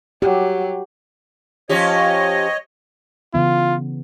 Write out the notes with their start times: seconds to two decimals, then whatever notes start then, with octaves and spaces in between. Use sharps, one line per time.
0.22 F#3 G4
1.69 F3 C#4 G4 C#5 D#5
3.34 C#3 E3 B3 F4